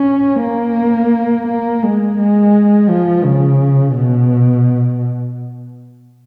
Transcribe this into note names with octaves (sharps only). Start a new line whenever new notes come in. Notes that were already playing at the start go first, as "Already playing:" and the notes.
Already playing: C#4
A#3
A#3
G#3
G#3
F3
C#3
B2